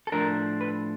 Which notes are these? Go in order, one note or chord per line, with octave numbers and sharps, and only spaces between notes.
A4
A2 F3 A3 D4 A#4
B4